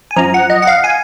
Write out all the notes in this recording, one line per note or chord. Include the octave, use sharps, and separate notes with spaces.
G#5
F#2 F3 A#5
F#5
D#5
F#5
F5
G#5